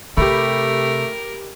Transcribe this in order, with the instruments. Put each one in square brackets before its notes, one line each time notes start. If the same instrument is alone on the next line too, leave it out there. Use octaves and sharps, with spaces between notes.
[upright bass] C3 [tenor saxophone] A3 [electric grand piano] G4 B5 [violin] A#4